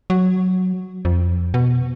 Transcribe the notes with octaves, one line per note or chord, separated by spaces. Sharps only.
F#3
F2
B2